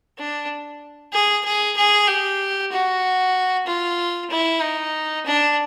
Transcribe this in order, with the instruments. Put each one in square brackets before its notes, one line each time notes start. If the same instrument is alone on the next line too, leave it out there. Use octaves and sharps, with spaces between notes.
[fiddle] D4
G#4
G#4
G#4
G4
F#4
F4
E4
D#4
D4